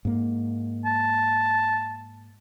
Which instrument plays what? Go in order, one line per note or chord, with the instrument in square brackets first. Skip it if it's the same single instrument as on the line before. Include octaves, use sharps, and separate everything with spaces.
[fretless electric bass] G#2 A#3
[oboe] A5